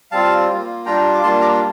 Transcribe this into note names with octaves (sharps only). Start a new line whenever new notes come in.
G3 C4 F4 F5 A5
A#3 F4
G3 D4 F4 G5 A#5
D6
G3 A#3 D4 F4 A5 C6
A#5 D6